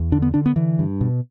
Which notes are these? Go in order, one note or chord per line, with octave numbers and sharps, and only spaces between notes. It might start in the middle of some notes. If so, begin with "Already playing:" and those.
Already playing: E2
D3 D4
B3
D3 D4
B3
D3 E3
G2
B2